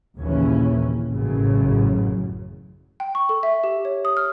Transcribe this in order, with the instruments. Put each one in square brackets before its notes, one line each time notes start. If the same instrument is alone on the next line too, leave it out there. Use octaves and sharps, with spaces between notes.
[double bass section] A#1 D#2 A#2 C#3 E3 C#4
A1 F#2 C#3
[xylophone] G5
C#6
A4
E5
G4
C#5
D#6
F6